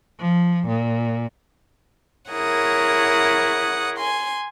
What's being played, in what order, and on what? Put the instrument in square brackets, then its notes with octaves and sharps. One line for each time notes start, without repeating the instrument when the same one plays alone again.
[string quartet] F3
A#2
E4 G#4 A#4 C#5 F#5 D#6
G#5 C6